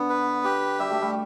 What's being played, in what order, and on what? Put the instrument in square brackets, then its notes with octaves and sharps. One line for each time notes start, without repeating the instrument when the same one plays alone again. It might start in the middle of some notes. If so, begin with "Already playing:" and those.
Already playing: [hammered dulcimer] D3 [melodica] B3
[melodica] B4
G4
[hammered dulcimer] G3 [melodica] E5
[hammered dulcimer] A3
G3